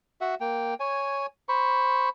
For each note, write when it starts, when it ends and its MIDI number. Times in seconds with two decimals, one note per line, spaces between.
0.21 0.35 66
0.21 0.35 76
0.21 0.35 78
0.41 0.74 58
0.41 0.74 79
0.80 1.26 73
0.80 1.26 80
1.49 2.09 72
1.49 2.09 83
1.49 2.09 85